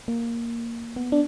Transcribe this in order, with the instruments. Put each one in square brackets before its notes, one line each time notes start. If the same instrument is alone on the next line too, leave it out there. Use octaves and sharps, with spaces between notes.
[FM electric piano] A#3
B3
D4